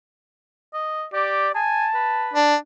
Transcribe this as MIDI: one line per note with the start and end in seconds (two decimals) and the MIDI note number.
0.74 1.05 75
1.13 1.48 67
1.13 1.53 74
1.55 1.87 80
1.55 2.35 81
1.95 2.37 71
2.33 2.56 62